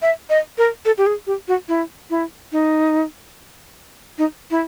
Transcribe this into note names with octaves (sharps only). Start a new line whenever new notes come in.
E5
D#5
A#4
A4
G4
G#4
G4
F#4
E4
E4
D#4
D#4
E4